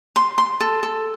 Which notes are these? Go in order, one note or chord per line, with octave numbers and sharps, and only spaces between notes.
C6
C6
A4
A4